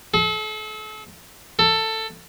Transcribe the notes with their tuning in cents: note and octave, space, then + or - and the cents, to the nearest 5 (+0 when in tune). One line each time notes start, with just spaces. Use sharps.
A4 -35
A4 +15